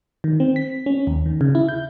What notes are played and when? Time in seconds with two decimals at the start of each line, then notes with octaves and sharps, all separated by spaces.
0.24 D#3
0.40 C4
0.56 B6
0.86 C#4
1.07 D#2
1.26 D#3
1.41 C#3
1.55 E4
1.69 G6